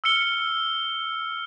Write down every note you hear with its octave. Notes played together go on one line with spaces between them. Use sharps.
E6 F6 C#7 G7